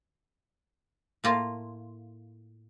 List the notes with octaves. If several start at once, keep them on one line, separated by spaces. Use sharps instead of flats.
A2 A#3 F4